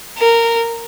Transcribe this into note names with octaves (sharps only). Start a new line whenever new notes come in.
A#4